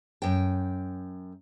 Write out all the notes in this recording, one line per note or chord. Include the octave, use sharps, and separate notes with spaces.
F#2 G5